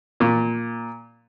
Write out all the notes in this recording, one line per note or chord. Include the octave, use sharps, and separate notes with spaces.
A#2